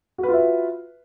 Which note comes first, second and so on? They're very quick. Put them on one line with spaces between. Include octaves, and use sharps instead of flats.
F#4 B4 F4 E5